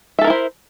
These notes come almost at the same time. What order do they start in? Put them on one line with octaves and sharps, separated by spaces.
E5 A4 A#4 E4 C5